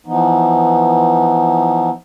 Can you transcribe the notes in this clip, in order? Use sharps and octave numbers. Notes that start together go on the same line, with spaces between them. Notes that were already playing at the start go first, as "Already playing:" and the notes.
E3 F3 B3 D#4